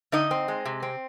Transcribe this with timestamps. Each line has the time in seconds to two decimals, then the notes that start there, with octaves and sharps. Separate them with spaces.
0.12 D3 D#4 D#5
0.31 C4
0.48 G#3
0.65 C3
0.83 C4